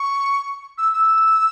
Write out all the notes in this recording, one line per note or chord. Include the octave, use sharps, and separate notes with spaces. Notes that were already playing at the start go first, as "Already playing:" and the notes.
Already playing: C#6
E6
E6